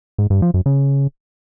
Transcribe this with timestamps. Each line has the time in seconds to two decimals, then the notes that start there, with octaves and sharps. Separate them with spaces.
0.18 G#2
0.30 G2
0.42 F3
0.54 F#2
0.66 C#3